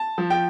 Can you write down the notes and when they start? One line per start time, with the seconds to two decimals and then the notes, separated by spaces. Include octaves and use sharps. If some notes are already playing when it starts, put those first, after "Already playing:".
Already playing: A5
0.18 F3
0.30 G5